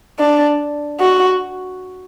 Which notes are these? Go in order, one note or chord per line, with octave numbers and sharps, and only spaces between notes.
D4
F#4